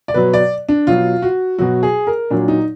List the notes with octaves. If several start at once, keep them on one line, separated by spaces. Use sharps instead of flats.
D5
B2 F#3 B4
D5
D4
B2 F#3 F4
F#4
B2 F#3 F#4
G#4
A#4
A#2 F#3 D4
D#4